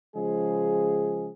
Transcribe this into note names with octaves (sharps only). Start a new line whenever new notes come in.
C#3 F3 G#3 G#4